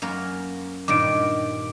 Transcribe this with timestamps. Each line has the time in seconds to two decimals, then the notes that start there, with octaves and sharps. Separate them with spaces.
0.02 F#2 A#3 A#4
0.88 G2 A#2 D#3 D6 D7